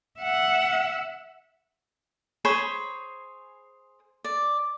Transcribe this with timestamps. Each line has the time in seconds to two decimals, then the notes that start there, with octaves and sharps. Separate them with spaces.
0.20 E5 F#5
2.45 G#4 C5 C#5 B5
4.24 D5